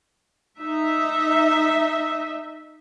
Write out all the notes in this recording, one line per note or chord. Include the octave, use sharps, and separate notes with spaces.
D#4 E5